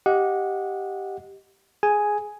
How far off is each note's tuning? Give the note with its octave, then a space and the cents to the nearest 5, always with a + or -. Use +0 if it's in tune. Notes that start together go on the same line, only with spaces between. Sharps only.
G4 -5 D#5 +5 F#5 -20
G#4 +5 G#5 +0